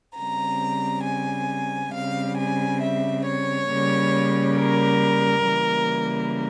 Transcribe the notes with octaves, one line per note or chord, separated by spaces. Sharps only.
C#3 G3 C4 A#5
G#5
C#3 G3 C4 F5
G#5
E5
C#5
C#3 G3 A#3
A#4
C#3 E3 G3 A#3